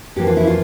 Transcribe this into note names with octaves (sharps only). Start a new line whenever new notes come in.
F2 E3 A#3 G4
F4
E4
F4